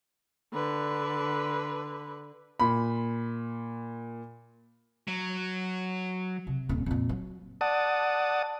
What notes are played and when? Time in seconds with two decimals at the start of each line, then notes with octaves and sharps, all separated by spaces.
0.53 D3 B4
2.60 A#2 B5
5.08 F#3
6.47 C3
6.69 D#1 C#4
6.86 F2 A#2
7.09 F#3
7.61 D5 F#5 A5 D#6